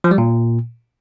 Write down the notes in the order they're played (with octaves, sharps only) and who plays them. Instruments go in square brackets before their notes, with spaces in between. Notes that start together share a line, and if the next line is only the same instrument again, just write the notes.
[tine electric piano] F3
G3
A#2